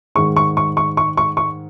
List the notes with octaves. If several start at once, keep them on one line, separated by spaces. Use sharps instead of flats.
G#2 D#3 C#6
C#6
C#6
C#6
C#6
C#6
C#6